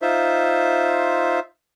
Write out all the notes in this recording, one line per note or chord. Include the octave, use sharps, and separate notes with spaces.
D#4 F4 C5 E5